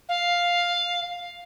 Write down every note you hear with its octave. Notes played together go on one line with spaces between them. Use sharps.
F5